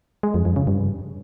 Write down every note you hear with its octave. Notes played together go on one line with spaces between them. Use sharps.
G#3
F2
F2
C#3
G2